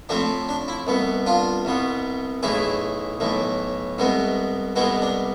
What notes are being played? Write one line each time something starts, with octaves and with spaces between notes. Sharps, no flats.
A2 F3 A3 C4 D4
D4
E4
C2 B2 B3
D4 F4
C2 B2 B3
B1 A2 E3 E4 G#4
B1 A2 E3
C2 B2 G#3 B3
C2 B2 G#3 B3 E4
D4